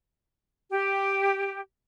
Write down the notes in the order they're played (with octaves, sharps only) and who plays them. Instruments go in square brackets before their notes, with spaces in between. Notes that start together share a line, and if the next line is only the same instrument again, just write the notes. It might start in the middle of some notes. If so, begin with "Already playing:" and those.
[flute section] G4